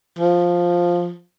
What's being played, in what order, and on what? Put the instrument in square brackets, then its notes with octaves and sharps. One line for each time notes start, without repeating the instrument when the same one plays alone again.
[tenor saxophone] F3